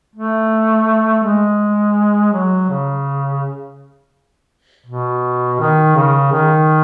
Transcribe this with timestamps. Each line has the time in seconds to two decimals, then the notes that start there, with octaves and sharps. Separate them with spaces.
0.16 A3
1.24 G#3
2.33 F#3
2.70 C#3
4.86 B2
5.60 D#3
5.96 C#3
6.32 D#3